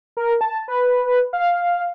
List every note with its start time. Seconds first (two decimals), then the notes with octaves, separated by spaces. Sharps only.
0.17 A#4
0.41 A5
0.68 B4
1.33 F5